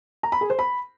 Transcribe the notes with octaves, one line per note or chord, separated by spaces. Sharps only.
A#5
B5
G#4
C5
B5